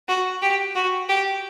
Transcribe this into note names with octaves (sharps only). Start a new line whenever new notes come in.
F#4
G4
F#4
G4